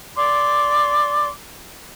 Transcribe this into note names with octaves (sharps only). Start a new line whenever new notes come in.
D5 C6 D6